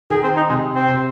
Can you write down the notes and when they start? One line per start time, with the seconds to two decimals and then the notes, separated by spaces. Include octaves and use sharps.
0.10 D#3 G#4
0.23 C4
0.36 D#4
0.49 C3 G#3
0.75 C4
0.88 C3